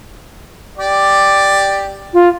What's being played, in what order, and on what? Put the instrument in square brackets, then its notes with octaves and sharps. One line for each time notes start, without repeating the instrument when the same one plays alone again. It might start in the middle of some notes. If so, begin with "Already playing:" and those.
[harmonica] G4 D5
[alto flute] F4